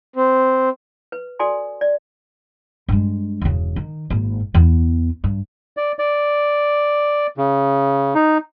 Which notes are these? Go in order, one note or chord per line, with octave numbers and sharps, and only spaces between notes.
C4
B4
F#4 A4 D5 G#5 C6
D5
G2 G#3
E1 C#3
D#3
G#1 A#3
E2 B3
G2
D5
D5
C#3
D#4